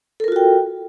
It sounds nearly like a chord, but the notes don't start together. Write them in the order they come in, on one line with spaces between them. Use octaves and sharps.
A4 A#4 F4 F#4 G5